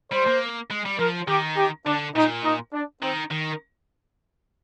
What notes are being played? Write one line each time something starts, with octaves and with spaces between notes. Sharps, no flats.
G3 C5
A#3
G#3
G3
F3 A#4
D#3 G4
G4
D3 D4
A#2 D#4
D#4
D4
D#3 C4
D#3